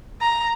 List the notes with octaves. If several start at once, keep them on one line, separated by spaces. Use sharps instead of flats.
A#5